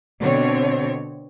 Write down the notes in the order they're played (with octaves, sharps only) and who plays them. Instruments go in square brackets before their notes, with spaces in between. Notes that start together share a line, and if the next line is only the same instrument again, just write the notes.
[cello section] B2 D3 C4 C#5